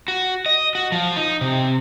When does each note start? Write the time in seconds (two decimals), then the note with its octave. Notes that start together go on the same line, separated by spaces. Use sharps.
0.08 F#4
0.46 D#5
0.75 F#4
0.92 F3
1.16 D#4
1.41 C3